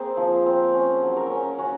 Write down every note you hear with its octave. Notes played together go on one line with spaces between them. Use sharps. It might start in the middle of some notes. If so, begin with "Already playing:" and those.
Already playing: A#3 C4 G#4
F3
C4
C#4
F#3
A#4
C#4
C#4 F#4